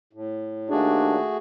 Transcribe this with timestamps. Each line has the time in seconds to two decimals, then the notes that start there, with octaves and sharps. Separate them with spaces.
0.13 A2
0.70 D#2 A3 D4 F#4 G#4